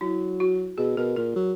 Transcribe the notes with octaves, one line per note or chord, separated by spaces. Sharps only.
F#3 E4
F#4
B2 G#4
B2 A#4
A#2 A#4
F#3